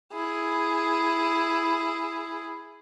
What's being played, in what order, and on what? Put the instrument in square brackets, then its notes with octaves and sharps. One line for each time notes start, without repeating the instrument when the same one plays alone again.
[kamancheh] E4 G#4